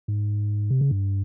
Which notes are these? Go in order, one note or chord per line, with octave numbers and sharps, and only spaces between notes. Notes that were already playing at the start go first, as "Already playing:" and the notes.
G#2
C3
C#3
G2